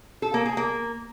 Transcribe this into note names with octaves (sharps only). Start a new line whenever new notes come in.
A4
A#3
G#4
A#3